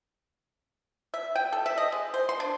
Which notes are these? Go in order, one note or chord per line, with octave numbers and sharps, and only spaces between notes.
E5
G5
A4
E5
D#5
G#3
C5
C6
D4